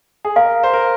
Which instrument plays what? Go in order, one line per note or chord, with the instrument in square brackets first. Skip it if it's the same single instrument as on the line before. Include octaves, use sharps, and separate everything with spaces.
[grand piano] G#4
[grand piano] A#4 [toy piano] F5
[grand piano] C5
A#4